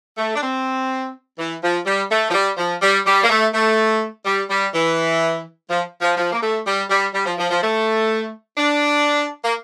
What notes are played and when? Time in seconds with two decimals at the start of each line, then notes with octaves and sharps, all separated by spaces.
0.18 A3
0.35 D4
0.42 C4
1.38 E3
1.62 F3
1.86 G3
2.10 A3
2.30 F3
2.33 G3
2.57 F3
2.82 G3
3.05 G3
3.23 A#3
3.29 A3
3.54 A3
4.25 G3
4.50 G3
4.74 E3
5.70 F3
6.01 F3
6.17 F3
6.32 A#3
6.42 A3
6.66 G3
6.89 G3
7.13 G3
7.26 F3
7.38 F3
7.50 F3
7.62 A3
8.58 D4
9.44 A#3